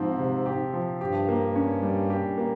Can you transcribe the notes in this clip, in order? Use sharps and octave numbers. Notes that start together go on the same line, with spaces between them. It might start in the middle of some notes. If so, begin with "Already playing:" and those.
Already playing: G#2 F3 C4
C3
G4
F3
G2 G4
A#3
C#4
G3
G4
A#3